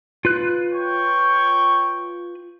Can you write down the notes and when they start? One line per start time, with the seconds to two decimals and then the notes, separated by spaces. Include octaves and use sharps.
0.25 F4 B4 F#6
0.71 C#5 G5 C#6